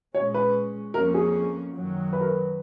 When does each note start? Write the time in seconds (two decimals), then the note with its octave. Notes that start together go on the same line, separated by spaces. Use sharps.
0.15 A#2 G#3 C#4 C#5
0.34 B4
0.94 F2 F3 A#3 C#4 A#4
1.14 G#4
1.74 F#2 D#3 F#3
2.13 B4
2.21 A#4
2.28 B4